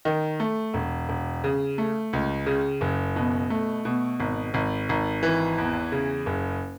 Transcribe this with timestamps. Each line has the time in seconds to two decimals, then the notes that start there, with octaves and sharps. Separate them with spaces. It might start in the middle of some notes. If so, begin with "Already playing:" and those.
0.05 D#3
0.40 A3
0.74 E1
1.09 E1
1.44 C#3
1.78 A3
2.13 C#2
2.46 C#3
2.81 F#1
3.16 B2
3.50 A3
3.85 B2
4.20 G#1
4.54 G#1
4.89 G#1
5.23 E3
5.58 E2
5.92 C#3
6.26 F#1